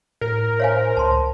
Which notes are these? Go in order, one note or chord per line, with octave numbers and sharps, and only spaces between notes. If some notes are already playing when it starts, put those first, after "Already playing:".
A2 A#4
C5 C#5 F5 G#5
C#2 A5 C6